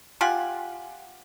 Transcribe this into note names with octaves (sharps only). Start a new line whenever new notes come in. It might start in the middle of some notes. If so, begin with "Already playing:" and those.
F4 G4 F#5 G#5